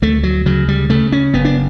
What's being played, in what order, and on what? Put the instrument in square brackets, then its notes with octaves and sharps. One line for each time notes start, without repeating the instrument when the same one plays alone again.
[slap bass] D2 A3
F#3
C#3 F#3
G3
C#3 A3
C#4
F#1 B3
D4